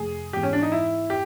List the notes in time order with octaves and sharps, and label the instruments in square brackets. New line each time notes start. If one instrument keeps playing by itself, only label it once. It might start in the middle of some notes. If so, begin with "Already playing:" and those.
Already playing: [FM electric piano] F2 C3 F3 A3 [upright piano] G#4
[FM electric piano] G#2 E3 G#3 B3 [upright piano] G4
[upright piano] C#4
D4
D#4
E4
G4